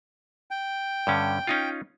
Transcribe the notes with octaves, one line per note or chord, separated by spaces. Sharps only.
G5
G2 D3 C#4
C#4 D#4 F4